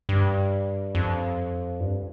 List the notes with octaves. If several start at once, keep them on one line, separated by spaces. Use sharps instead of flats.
G2
F2
G2